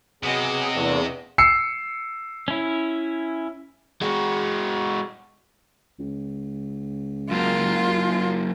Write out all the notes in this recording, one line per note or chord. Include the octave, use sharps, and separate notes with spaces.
C3 F#3 B3 G#4 D#5 F#5
E2 A3 A#3 D4
E6 C7 C#7
C#4 E4
G#3 F#4
C#2
F#2 A#3 F4